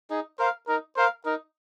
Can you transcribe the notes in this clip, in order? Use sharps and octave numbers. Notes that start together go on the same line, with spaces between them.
D#4 G#4
A#4 C5 F5
D#4 A#4
A#4 C5 F5
D#4 A#4